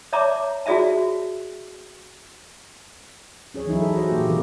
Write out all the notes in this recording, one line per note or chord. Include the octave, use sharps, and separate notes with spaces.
C#5 D5 E5 A5 A#5 D6
F#4 G#4 D5 E5 A5
C#4 G#4 C#5
E3 F#3 D#4 E4
A4 D#5
F#4 C5
A#2 A#3 F4 G4
C3 D#3 E3 C4 G#4 A#4